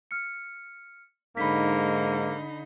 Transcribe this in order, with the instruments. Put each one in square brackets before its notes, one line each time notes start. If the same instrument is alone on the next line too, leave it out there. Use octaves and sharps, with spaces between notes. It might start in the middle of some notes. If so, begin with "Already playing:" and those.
[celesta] F6 C#7
[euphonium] G#2 [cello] D3 D#4 [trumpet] A#3 [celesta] B5 B6